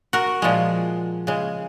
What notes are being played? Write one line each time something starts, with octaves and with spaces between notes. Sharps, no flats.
F#4 A#4
A#2 F3 G#3
C#3 G#3